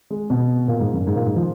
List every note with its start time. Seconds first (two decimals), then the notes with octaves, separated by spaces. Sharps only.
0.10 G#3
0.30 B2
0.68 A#2
0.80 G#2
0.94 F#2
1.07 G#2
1.16 A#2
1.26 G#2
1.36 F3